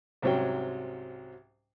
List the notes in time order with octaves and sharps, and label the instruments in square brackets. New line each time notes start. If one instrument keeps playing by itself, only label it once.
[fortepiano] C2 G#2 C3 F#3 C#4 G5